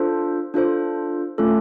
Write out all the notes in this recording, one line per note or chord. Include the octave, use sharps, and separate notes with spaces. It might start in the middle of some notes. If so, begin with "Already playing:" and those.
Already playing: D4 F4 A4 C5
D4 F4 A4 C5
A3 C#4 F4 A4